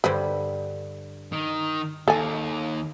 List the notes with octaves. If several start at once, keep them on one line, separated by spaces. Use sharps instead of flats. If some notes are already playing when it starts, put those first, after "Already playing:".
G2 D3 G3 B4 C5
D#3
D#2 A4 G#5